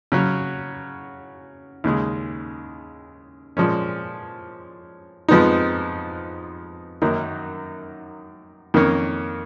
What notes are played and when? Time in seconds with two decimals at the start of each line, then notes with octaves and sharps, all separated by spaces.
0.12 C#3 F#3 C#4
1.84 D#2 C#3 G#3
3.57 A#2 F3 G#3 C#4
5.29 F2 F3 G#3 B3 D#4
7.02 F#2 D#3 F#3 A#3 D#4
8.74 F2 D#3 A#3 C#4